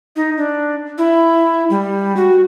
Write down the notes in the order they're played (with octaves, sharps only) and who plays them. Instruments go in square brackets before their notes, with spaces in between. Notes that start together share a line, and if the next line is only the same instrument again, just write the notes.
[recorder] D#4
D4
E4
G3
F#4